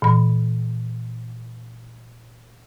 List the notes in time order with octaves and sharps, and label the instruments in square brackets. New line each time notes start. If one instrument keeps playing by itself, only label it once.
[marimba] A#2 E3 B5